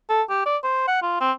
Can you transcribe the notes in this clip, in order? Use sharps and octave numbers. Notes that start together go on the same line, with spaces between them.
A4
G4
D5
C5
F#5
F4
C4